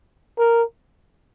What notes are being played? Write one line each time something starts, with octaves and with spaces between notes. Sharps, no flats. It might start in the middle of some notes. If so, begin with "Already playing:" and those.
A#4